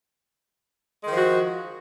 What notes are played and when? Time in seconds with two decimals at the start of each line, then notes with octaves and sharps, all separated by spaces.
1.02 G#3
1.06 D#3
1.11 F3
1.16 F#4